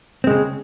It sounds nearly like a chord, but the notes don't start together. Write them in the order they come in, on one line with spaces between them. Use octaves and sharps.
C4 G#3 C#3